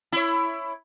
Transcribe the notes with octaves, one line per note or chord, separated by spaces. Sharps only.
E4 C#5